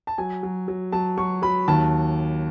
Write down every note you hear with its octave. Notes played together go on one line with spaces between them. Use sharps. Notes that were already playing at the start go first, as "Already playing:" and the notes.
A5
F#3 G#5
F#3
F#3
F#3 A5
F#3 C#6
F#3 B5
D#2 A5